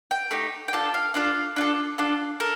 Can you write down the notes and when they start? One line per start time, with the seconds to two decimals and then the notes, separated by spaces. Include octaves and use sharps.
0.11 G5
0.31 A3 D#4 G4
0.68 G5
0.73 D4 F4 A4 A5
0.94 F5
1.14 D4 F4 A4 F5
1.56 D4 F4 A4
1.98 D4 F4 A4
2.40 A4 A#4